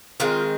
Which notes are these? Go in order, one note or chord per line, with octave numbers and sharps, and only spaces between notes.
D#3 G#3 C4 F4